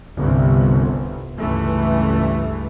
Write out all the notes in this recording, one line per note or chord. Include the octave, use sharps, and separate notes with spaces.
G1 C2 C3
C#2 G2 E3 A3